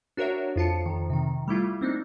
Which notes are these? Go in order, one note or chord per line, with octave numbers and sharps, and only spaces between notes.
D4 F#4 A#4 C#5 E5
F2 F4 A5 C#7
F2 D#3
C3 D#3
G3 A3 E4 F4
A#3 C4 D4 D#4